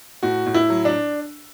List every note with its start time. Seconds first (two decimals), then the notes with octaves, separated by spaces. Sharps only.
0.23 A2 F#4
0.46 A2
0.54 E4
0.70 F#3
0.85 D4